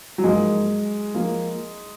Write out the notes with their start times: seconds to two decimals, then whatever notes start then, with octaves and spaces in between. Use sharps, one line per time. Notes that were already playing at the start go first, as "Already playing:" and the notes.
0.18 F#3
0.23 G#2 F3 G#3 A#3
1.15 F3 A#3